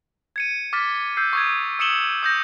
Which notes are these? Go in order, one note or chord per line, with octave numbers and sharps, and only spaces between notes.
G#6 C#7 D#7
D6 F6 A6 B6
E6 G6 C7
C#6 D#6 G#6
D#6 E6 C#7 E7 F#7 G7
D#6 G6 A#6